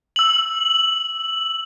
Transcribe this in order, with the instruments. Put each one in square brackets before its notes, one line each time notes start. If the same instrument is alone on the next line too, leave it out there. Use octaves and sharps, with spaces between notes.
[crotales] E6 F#7